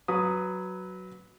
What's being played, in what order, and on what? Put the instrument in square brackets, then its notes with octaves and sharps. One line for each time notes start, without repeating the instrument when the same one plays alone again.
[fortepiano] F#3 B4 D#6